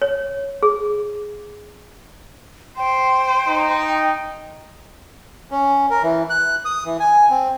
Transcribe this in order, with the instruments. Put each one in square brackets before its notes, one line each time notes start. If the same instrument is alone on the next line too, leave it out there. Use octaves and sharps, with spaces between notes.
[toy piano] C#5
G#4
[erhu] C5 [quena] G5
[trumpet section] D#4
[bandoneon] C#4
A#4
E3
F#6
D#6
E3
G#5
C4